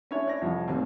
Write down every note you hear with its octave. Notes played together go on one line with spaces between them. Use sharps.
C#4 D4 E4 C#5
E4 D5 G#6 A#6
C2 F2
A1 D#2 C4